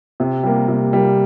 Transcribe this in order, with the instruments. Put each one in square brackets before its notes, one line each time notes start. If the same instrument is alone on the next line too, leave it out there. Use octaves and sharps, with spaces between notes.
[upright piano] C3
G3 A#3
C3
G3 A#3